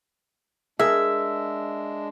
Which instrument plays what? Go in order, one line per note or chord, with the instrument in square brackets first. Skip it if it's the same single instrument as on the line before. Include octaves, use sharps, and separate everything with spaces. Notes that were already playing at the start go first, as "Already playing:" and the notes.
[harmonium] G#3 D4 [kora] G#4 A#4 [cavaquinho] E5